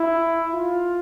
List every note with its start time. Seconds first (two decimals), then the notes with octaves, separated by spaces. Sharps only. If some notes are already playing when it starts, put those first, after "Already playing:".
Already playing: E4
0.52 F4